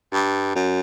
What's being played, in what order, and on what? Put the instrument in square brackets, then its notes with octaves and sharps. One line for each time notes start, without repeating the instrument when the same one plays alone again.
[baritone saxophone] G2
F#2